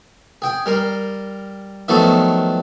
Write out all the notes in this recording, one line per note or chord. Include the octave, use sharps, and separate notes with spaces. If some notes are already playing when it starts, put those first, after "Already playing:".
G#4 G5
G3 A#4 C6
D#3 F3 F#3 A3 B3 A4